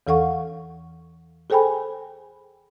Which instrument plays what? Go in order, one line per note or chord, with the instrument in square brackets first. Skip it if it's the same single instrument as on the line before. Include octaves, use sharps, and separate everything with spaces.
[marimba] E2 E3 A4 F5 F#5 C#6
G#4 A4 C5 G5 G#5 B5